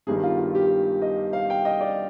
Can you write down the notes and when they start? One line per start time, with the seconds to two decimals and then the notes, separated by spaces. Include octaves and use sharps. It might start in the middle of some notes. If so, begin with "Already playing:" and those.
0.07 G1 G2 D#3 G#4
0.23 F4
0.38 F4
0.55 G4
1.02 D#5
1.33 F5
1.50 G5
1.65 D#5
1.81 D5